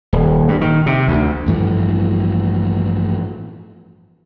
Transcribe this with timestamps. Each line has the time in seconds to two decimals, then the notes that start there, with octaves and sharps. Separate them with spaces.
0.13 D#1
0.48 G2
0.61 D#3
0.86 C3
1.08 D2
1.46 A1 G2 E3 F3